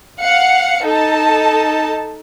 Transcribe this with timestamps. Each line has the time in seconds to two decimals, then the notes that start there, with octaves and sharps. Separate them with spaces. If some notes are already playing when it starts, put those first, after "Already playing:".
0.21 F5 F#5 C#7
0.85 D#4 A4 A5